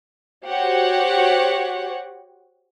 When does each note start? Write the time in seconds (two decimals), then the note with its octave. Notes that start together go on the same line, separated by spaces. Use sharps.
0.46 F#4 G4 C5 C#5 F#5